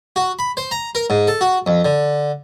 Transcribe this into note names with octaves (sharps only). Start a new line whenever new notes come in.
F#4
B5
C5
A#5
A#4
G#2
A4
F#4
F2
D3